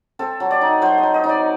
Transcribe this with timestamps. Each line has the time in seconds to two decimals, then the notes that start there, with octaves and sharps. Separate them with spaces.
0.19 C4 A4
0.40 F#3
0.51 D5
0.61 D#4
0.82 F#3 C5
0.98 D#5
1.03 F#3
1.14 D#5
1.24 D#4
1.29 D5